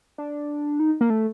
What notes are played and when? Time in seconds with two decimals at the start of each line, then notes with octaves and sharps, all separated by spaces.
0.18 D4
0.80 D#4
1.01 A#3
1.10 A3